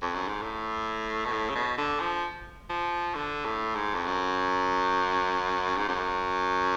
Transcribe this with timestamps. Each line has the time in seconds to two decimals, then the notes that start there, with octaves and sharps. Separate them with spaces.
0.02 F2
0.14 F#2
0.28 G#2
0.42 A2
1.26 B2
1.32 A2
1.49 C#3
1.55 B2
1.78 D3
2.00 F3
2.69 F3
3.15 D3
3.45 A2
3.75 G#2
3.94 F2
4.06 F#2
5.77 G#2
5.88 F#2